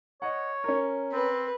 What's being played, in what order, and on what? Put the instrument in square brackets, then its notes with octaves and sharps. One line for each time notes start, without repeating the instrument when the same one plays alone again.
[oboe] C#5 [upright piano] D#5 F#5
[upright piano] C#4 A#4
[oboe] C4 [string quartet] B4